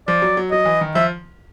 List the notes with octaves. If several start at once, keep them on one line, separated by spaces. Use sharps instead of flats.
F3 D5
F#3
F#3
F#3 D#5
E3
D#3
F3 E5